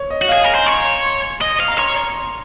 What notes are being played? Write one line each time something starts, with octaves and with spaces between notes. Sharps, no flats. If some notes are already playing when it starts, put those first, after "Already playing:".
Already playing: C#5
D#5
F#4
G#4 F5
A#4 G#5
C5 A#5
C#5 C6
D#5
F5
A#5
C#5 C6